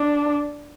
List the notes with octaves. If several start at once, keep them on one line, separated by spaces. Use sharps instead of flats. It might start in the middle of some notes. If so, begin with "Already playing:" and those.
Already playing: D4